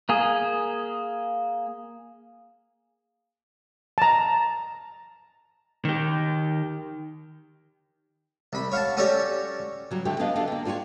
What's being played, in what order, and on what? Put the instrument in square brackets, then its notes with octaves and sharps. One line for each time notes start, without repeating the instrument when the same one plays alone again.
[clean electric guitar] A#3 G#4
[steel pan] A5 A#5
[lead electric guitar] D#3 G4
[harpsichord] C2 B5
C#5 F5 F#5 A5
C#4 F#4 G4 A4 C#5 D5
[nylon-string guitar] C#3 F#3 G3
D3 A3 G4
B3 D4 D#5 F5
A3 D4 A4 F5
D3 A#3
D4 F4 G4 B4 C#5